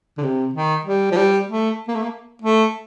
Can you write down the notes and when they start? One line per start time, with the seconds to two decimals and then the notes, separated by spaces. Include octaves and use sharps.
0.18 D3
0.23 C3
0.54 D#3
0.85 G3
1.12 F3
1.16 G3
1.48 A3
1.88 A#3
1.95 A3
2.02 A#3
2.42 A3